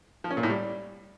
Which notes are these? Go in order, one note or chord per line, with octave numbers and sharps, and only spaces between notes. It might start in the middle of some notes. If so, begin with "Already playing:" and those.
F3
C#4
A#2
A2
G3